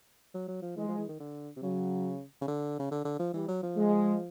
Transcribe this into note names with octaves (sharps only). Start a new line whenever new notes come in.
F#3
F#3
F3
E3 G#3
F3
E3
D#3
D3
C3
C#3 F#3
C#3
D3
C#3
D3
D3
F3
E3 G3
F#3
F3
G#3